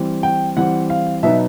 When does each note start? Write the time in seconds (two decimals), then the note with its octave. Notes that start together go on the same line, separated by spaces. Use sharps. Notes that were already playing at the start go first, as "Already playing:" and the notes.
Already playing: E3 G3 C4
0.23 G5
0.56 E3 G3 C4 F#5
0.90 F5
1.23 B2 F#3 B3 D#4 E5